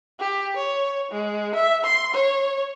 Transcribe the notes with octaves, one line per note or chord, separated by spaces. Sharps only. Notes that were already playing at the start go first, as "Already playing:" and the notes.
G4
C#5
G#3
E5
C6
C#5